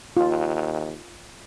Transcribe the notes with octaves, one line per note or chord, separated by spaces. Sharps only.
D#2 F4